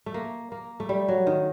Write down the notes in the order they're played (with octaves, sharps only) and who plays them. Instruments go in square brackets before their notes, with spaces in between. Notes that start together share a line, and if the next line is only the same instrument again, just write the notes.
[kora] A3
A#3
A#3
A3
G3
F#3
D#3